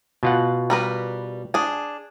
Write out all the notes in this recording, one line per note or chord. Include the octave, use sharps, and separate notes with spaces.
B2 F4 F#5
G3 A#4 B4
D4 G#4